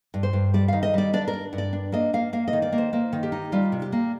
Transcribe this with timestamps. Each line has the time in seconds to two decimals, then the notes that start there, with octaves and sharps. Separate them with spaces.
0.14 G2
0.23 C5
0.33 G2
0.54 G3 D5
0.68 D#3 F5
0.83 D#5
0.94 G3 D5
1.13 D4 D5
1.28 A#4
1.33 D4
1.53 G2
1.58 D5
1.73 D4
1.92 A#3 D#5
2.13 A#3 F5
2.33 A#3 F5
2.48 D#5
2.53 D#3
2.62 D5
2.72 A#3
2.78 C5
2.93 A#3 C5
3.13 D#3
3.23 G4
3.32 D#4
3.52 G3 F4
3.72 C3
3.82 G4
3.92 A#3